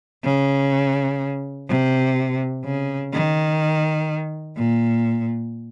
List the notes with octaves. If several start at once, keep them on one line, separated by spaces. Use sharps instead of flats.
C#3
C3
C#3
D#3
A#2